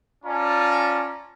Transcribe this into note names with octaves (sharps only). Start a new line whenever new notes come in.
C#4 F4 D5 A5 A#5